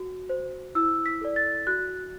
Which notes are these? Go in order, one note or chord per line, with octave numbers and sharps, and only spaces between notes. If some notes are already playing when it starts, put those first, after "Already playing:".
Already playing: F#4
C5
E4 E6
B6
A4 D5
A6
F#4 F#6